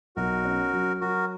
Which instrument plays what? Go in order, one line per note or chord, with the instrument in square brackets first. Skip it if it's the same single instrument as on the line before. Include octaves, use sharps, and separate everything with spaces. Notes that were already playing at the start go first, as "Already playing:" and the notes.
[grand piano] B1 [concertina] F#4 A#4
[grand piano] C#4
F#3
[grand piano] F#3 [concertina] F#4 A#4